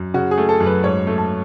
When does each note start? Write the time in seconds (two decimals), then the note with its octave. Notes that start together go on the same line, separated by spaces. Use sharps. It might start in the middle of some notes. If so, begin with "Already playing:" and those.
Already playing: F#2
0.14 C#3 F#4
0.31 G#4
0.38 A3
0.49 A4
0.61 F#2
0.66 B4
0.84 G#2 C#5
1.07 A3
1.18 A5